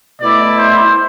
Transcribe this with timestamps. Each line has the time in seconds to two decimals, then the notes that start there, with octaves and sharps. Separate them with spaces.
0.20 B2 A3 E4 D5
0.58 C5